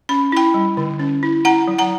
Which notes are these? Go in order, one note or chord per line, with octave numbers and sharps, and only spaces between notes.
C#4 B5
E4 G5 B5
G3
D3
C#4
E4
E4 F#5 A#5
F#3
F#5 A#5